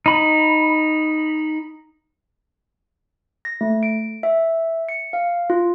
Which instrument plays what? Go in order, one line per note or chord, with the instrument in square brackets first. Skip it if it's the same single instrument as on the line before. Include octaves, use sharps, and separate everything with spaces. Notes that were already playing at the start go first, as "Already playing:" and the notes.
[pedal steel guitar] D#4 B5
[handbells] A#6
A3
D7
E5
C#7
F5
F4